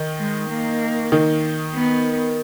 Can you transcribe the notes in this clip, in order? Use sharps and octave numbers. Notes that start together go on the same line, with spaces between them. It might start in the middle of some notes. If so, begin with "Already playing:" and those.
Already playing: D#3 D#4
G#3
A#3
D#3 D#4
B3